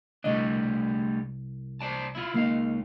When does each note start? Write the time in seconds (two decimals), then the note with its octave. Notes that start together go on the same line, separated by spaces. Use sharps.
0.24 C2 G3 A3 D4 D#5
1.81 C5 D5 A5
2.15 E4 F4
2.34 C#2 A#3 D#4 F5